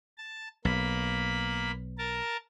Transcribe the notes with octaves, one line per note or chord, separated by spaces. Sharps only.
A5
B1 A#3 B5
A#4 A5